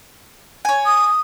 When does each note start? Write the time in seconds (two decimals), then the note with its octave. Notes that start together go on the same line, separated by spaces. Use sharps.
0.65 C#5 G#5
0.86 D#6